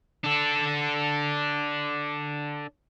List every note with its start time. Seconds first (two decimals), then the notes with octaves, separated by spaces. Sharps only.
0.24 D4 A4